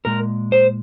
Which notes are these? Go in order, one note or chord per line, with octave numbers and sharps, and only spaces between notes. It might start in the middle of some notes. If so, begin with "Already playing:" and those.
A#2 G#3 A#4
C5